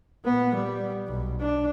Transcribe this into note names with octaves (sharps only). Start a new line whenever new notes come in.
A#2 B3
G3
B1
D4